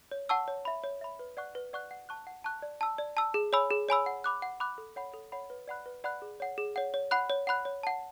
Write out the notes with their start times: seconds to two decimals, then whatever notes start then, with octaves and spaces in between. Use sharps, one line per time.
0.11 C#5
0.29 F#5 A5 C#6 E6
0.48 C#5
0.65 E5 B5
0.84 C#5
1.01 E5 B5
1.19 B4
1.37 D5 F#5 C#6 F#6
1.55 B4
1.73 D5 F#5 C#6 F#6
1.91 F#5
2.09 A5 C#6 F#6
2.27 F#5
2.44 A5 C#6 F#6
2.62 D5
2.81 A5 E6
2.98 D5
3.17 A5 E6
3.34 G#4
3.53 C#5 G#5 B5 E6
3.70 G#4
3.89 C#5 G#5 B5 E6
4.06 F#5
4.24 B5 D6 F#6
4.42 F#5
4.60 B5 D6 F#6
4.78 A4
4.96 C#5 F#5 B5
5.14 A4
5.32 C#5 F#5 B5
5.50 B4
5.68 D5 F#5 B5 F#6
5.86 B4
6.04 D5 F#5 B5 F#6
6.22 G#4
6.40 C#5 F#5
6.58 G#4
6.76 C#5 F#5
6.94 C#5
7.11 F#5 B5 F#6
7.30 C#5
7.47 F#5 B5 F#6
7.65 C#5
7.83 F#5 A5